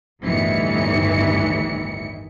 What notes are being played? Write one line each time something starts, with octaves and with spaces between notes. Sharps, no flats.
G1 D2 A2 D#3 E3 C#7